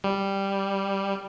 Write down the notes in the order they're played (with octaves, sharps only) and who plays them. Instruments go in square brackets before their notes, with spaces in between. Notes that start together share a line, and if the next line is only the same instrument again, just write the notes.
[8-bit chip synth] G3